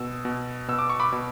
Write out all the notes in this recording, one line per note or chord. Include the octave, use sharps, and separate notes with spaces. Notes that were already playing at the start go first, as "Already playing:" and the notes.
Already playing: B2 E6
B2
B2 E6
D6
C#6
B5 D6
B2